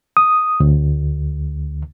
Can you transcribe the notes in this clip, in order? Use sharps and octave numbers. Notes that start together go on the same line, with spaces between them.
D#6
D2